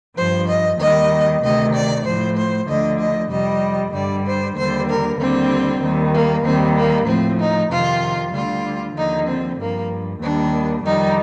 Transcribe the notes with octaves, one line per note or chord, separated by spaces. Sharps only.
G2 F3 C5
D#5
D#2 D#3 G3 D#5
D2 C3 D#3 D#5
D5
A2 F3 C5
C5
D2 D3 F3 D#5
D#5
F2 C3 G3 D#5
G2 D3 G3 D5
C5
D#2 D3 G3 C5
A#4
D#2 D3 G3 C4
D#2 D#3 G3
A#3
D#2 D#3 G3 C4
A#3
A2 F3 C4
D#4
F2 C3 D#3 F4
D2 D3 G3 F4
D#2 D3 F3 D#4
C4
G2 F3 A#3
D#2 D#3 G3 D4
F2 D#3 G3 D#4